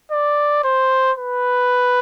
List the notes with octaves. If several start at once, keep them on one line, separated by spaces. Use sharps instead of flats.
D5
C5
B4